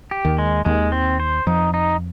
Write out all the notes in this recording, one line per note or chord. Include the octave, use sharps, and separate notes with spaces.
G4
D#2 D#3
G#3
D#2 D#3 G#3
C4
C5
F2 F3 D#4
D#4